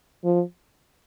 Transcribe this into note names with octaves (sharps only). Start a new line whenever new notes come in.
F3